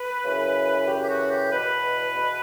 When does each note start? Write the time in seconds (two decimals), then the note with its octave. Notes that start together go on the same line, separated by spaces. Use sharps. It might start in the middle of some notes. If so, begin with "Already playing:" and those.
Already playing: B4
0.24 F#2 C#3 E3
0.87 F#2 C#3 E3 G4
1.02 G4
1.08 F#4
1.29 G4
1.50 E2 B2 B4
2.13 E2 B2